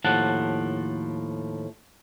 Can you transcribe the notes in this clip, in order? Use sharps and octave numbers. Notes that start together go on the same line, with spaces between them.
D#2 A2 F3 F#5 A5